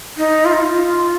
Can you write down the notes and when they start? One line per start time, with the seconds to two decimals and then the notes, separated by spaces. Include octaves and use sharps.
0.17 D#4
0.45 F4
0.53 D#4
0.60 F4